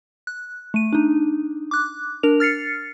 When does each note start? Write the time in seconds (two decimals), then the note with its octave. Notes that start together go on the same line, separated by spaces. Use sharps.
0.27 F#6
0.74 A3 D#7
0.93 D4 D#4
1.71 D6 F#6
2.23 D4 A#4 F7
2.40 F6 A6 C7 C#7